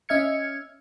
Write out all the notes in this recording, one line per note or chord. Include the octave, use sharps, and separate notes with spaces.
C#4 D#5 E5 F6 G#6 C#7